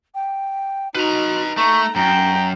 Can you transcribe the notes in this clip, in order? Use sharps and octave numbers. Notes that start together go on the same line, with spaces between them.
G5
D#4 F#4 B4 A#5
A3 A#5 C#6
F#2 G5 A#5